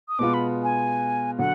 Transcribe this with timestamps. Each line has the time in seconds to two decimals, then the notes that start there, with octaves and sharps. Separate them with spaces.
0.08 D#6
0.19 B2 G#3 B3 F4 D6
0.34 B5
0.64 G#5
1.39 D3 F#3 F#5